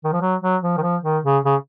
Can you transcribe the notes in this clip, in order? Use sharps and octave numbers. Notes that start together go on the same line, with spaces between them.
D#3
F3
F#3
F#3
F3
D#3
F3
D#3
C#3
C#3